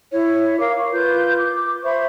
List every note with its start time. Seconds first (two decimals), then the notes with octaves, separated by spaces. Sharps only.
0.12 E4 C#5
0.60 A#4 F5 D6
0.78 C#6
0.92 F4 B4 G6
1.38 D6
1.84 C5 E5 B5 C#6